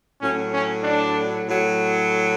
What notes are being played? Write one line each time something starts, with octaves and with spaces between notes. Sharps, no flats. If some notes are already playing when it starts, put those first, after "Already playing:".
A2 F#3 C#4
C#4
D4
A2 F#3